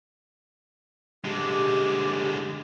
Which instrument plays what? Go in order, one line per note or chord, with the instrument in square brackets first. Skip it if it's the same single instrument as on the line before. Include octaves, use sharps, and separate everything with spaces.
[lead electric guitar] D3 G#3 [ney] G4